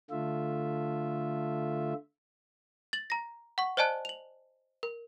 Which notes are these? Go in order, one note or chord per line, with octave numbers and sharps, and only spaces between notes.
D3 A3 F4 E5
A6 F#7
A#5 A#6
F#5 C#6
C5 D5 D#5 G#5 A5 F#6
F7 F#7
A#4